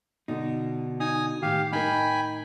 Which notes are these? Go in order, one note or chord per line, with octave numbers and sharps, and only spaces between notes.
B2 D3 D#4
D#4 G#5 D#6
A2 D#3 G4 F5
D#4 A#4 G5 G#5 B5